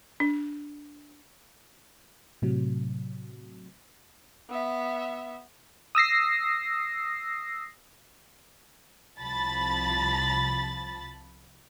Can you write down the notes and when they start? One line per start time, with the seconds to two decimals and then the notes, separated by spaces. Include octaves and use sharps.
0.20 D4
2.42 A2 C3 F#3
4.50 B3 E5
5.95 D#6 E6 A#6 C7
9.20 C2 F3 A5 B5 A6